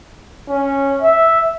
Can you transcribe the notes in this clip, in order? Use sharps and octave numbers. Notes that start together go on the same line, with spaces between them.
C#4
E5